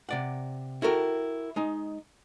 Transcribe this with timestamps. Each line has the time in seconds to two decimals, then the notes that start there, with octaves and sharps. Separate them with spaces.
0.09 C3 D5 F#5
0.82 E4 F#4 A4 A#4 G5
1.56 G#3 D#4